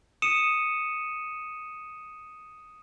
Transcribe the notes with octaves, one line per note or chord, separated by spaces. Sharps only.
D#6 C#7 D#7 E7